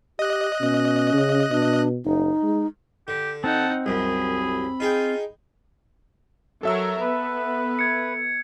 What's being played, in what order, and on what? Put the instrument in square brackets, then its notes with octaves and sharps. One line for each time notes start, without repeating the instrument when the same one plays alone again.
[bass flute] G4 [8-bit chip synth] D#5 F#6
[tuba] B2 [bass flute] C#4
[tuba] C#3
[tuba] B2 [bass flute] D4
[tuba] F#1 [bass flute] D#4
[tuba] G#3
[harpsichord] D3 [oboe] G4
[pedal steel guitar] C4 [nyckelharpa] D#4 F#5 [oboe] A5
[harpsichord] C2 F#2 [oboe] G#4 [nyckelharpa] B5
[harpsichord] D#4 G#4 G5 [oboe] F4
[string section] F#3 A#4 [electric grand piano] A4 E5 E6
[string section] B3 [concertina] B4
[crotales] G#6 C#7